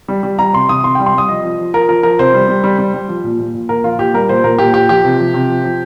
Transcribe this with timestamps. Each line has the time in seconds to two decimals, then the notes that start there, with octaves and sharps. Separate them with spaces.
0.08 G3
0.23 G3
0.38 G3 A#5
0.53 C3 C6
0.69 C3 D#6
0.84 C3 C6
0.95 G3 G5
1.06 C6
1.14 G3 D#6
1.28 F3 D#5
1.43 F3
1.59 F3
1.74 F3 A#4
1.89 F3 A#4
2.03 F3 A#4
2.19 C3 C5
2.34 G3
2.48 G3
2.64 G3
2.78 G3
2.94 G3
3.08 F3
3.24 A#2
3.40 A#2
3.55 A#2
3.69 A#2 A#4
3.84 F3 F4
3.98 A#2 G4
4.14 G3 A#4
4.29 A#2 C5
4.44 A#2 A#4
4.58 A#2 G4
4.74 A#2 G4
4.89 F3 G4
5.05 C3
5.19 F3
5.34 C3
5.49 F3
5.64 F3